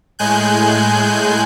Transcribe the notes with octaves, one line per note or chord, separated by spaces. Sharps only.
A2 G#3 G#5 F#6 G6